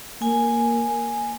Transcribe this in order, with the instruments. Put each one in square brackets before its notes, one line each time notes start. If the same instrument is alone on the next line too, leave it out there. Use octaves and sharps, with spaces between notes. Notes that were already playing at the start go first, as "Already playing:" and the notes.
[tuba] A#3 [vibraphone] G#5